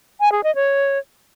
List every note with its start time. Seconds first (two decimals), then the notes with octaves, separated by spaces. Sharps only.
0.20 G#5
0.32 G#4
0.44 D#5
0.55 C#5